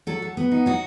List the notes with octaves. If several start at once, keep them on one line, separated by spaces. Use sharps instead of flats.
F#3 A4
F#3
B3
D#4
F#3 F#4